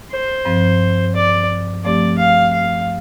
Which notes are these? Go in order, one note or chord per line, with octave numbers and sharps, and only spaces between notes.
C5
G2 F3 C4
D5
F3 A3 C4 G4 D5
F5
F5